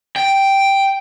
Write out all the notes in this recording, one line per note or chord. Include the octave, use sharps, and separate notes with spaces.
G5